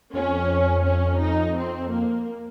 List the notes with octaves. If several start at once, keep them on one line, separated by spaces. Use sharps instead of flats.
F2 C#4
C#4
D#4
C4
A#3